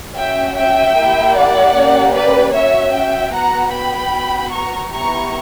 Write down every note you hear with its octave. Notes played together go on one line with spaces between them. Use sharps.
C#4 F#4 E5 G5
E5 G5
A#3 E4 G4
D5 F#5
A#3 C#4 G4
B4 D5
C#4 F#4 C#5 E5
E5 G5
B3 F#4 F#5 A#5
G5 B5
B3 F#4
A#5 C#6
B3 E4 G4 A#5 C#6